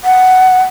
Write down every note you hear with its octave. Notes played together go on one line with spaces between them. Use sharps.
F#5